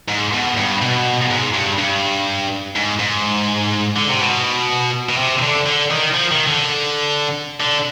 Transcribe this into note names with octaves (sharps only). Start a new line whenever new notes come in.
G#2
B2
G2
B2
G#2
G2
G2
G#2
G#2
D3
C3
B2
B2
C3
D3
D3
D#3
F3
D#3
D3
D3